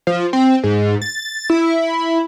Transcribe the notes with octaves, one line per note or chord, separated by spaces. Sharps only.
F3
C4
G#2
A6
E4